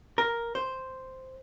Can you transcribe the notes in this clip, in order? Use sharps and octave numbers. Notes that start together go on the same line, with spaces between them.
A#4
C5